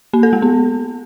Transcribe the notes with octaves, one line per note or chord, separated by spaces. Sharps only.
A#3
A4
G#3
B3